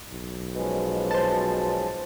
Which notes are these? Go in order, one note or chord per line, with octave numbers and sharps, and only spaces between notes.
B1
B2 F3 G#3 C#4
C5 A5